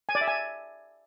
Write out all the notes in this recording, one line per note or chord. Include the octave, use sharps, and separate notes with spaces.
G#5
D5
E5
G#5